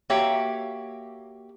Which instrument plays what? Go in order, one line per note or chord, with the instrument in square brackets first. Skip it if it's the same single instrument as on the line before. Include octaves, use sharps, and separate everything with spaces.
[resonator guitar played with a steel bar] A#3 F#4 G4 C#5 E5